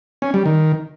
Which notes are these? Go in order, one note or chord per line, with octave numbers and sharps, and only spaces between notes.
C#4
G3
D#3